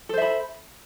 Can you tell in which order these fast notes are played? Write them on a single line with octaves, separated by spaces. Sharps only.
A4 C5 E5 B5